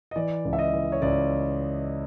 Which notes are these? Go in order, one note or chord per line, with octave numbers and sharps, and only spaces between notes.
D#5
E3 D5
C#2
E5
D#5
E3
C#5
C#2 D5